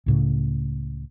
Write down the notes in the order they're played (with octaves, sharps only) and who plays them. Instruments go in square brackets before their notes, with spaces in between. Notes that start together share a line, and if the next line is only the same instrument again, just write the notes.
[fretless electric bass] C#2 A2 C#3